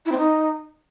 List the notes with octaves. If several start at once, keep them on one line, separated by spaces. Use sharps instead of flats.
E4
C4
D#4